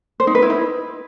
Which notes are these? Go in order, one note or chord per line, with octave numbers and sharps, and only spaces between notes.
C5
D#4
B4
E4
D#4